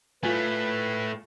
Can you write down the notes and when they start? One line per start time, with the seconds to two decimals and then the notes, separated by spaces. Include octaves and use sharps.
0.23 A2 A3 F4 B4 G#5